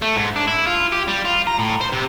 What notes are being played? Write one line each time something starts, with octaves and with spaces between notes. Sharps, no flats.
A3
G#2
D4
E4
F4
G4
G3
F4
A#5
A2
C5
C3